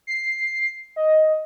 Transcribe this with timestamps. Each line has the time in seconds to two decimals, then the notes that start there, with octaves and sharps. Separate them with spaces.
0.07 C7
0.96 D#5